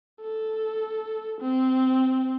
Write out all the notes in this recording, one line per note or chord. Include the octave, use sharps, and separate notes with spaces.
A4
C4